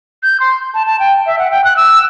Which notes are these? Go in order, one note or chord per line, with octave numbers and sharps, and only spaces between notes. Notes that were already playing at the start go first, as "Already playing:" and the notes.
G6
C6
A5
A5
G5
E5
F#5
G5
F#6
E6